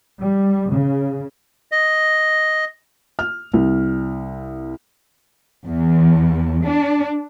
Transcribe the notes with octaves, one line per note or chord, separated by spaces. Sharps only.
G3
C#3
D#5
F6
C2
E2
D4